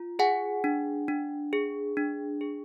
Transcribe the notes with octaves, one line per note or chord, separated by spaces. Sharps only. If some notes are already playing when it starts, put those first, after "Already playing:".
Already playing: F4
G#4 F#5 G#5
D4
D4
G#4
D4
G#4